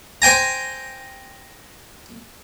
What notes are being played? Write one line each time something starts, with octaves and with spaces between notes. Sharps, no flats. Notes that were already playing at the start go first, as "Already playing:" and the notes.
C5 G5 G#5 A#5